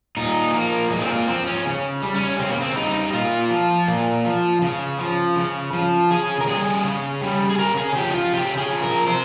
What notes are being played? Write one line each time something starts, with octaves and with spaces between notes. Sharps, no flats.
A#2 D#4
F3 A#3
A#2 G#3
C4
A#3
F3 C4
C#4
C#3
G3
C#4
C#3 C4
A#3
C4
G3 D#4
A#2 F4
F3
A#2
F3
C#3
F3
C#3
F3
C#3 G#4
A#4
G3 G#4
C#3
G3
G#4
C#3 A#4
G#4
F3 G4
D#4
F4
C#3 G4
G#4
F3
A#4
C3 C5